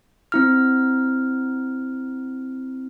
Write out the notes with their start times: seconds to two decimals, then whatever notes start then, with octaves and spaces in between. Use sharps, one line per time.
0.32 C4 E4 F6